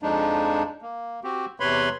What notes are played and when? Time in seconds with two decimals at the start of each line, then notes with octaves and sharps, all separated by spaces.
0.02 F2 F3 G#3 D4 D#4
0.82 A#3
1.24 C4 F#4 G4
1.60 E2 C3 B4 C#5 B5 C6